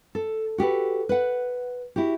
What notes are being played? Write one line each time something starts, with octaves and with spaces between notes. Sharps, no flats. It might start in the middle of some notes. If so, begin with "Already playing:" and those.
A4
F#4 G4 A4 B4
B4 F#5
E4 F#4 G4